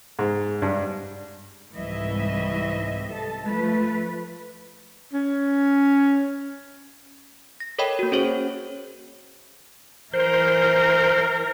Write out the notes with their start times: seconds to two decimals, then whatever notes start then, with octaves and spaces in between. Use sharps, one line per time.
0.19 G#2
0.62 G2
1.75 C2 G#2 E3 D#5 E5
3.12 A4 A5
3.46 F3 A3 B4
5.13 C#4
7.60 A#6
7.79 A4 A#4 C#5 D#5 G5 B5
7.99 A#3 F#4
8.12 C#4 F#4 G#4 C5 C#5
10.14 E3 A#4 C5